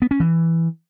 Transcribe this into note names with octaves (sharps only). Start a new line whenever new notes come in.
B3
C#4
E3